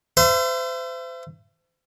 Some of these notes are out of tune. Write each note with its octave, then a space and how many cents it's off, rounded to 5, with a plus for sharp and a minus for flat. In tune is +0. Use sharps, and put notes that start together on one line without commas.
C5 -35 E5 +35